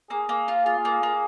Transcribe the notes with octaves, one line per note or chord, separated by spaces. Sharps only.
A#3 G#4
A#3
F4
F4 G#4
A#3
A#3